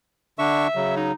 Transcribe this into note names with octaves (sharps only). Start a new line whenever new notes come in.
D3 D4 E5 C#6
C#3 F#3
D#4